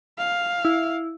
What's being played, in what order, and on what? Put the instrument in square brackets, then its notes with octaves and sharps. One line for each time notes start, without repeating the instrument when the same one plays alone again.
[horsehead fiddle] F5
[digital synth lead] E4